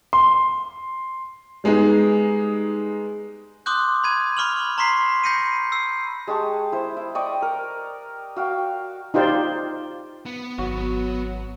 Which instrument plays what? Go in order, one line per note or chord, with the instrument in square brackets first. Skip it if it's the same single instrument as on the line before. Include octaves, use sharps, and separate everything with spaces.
[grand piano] C6
[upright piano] G3 G#3 B3 D#4 G#4
[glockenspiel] C6 D6 D#6 F#6 G6
B5 G#6 D#7
B5 C#6 F6 F7 F#7
A#5 C6 C#6 B6 C7
B5 G6 A#6 C7 C#7 D#7
E6 C7
[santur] G#3 G4 A5 C#6
E4 C5
E4
D5 D#5 G5 C#6
A#4
F#4 F5 G5
[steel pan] D#4 F4 G4 C5 D5
[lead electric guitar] B3
[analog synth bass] G#1 [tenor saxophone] F#3 [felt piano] F#4